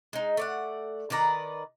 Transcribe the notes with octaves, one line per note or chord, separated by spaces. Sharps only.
G#3 D#4
A3 D5 F#5
D#3 B4 D5 A#5